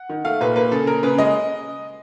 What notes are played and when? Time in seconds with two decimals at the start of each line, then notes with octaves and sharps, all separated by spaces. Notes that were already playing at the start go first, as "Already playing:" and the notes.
Already playing: F#5
0.09 D#3
0.25 A3 F5
0.41 A#2 B4
0.56 A#3 B4
0.72 C#3 A4
0.87 A#3 A#4
1.03 C#3 B4
1.18 G#3 D#5